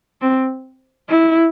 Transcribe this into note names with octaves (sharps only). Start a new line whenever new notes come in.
C4
E4